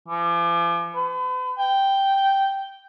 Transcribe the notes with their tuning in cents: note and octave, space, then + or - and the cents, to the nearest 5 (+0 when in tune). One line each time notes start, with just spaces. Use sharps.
F3 -45
B4 +40
G5 -5